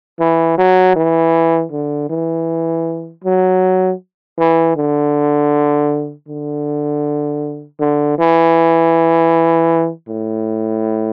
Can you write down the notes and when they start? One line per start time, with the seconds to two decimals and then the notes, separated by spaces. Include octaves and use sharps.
0.20 E3
0.58 F#3
0.96 E3
1.72 D3
2.10 E3
3.24 F#3
4.38 E3
4.76 D3
6.28 D3
7.80 D3
8.18 E3
10.08 A2